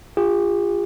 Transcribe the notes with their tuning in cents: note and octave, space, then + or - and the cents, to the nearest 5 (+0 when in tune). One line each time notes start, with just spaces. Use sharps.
F4 +0 G#4 -45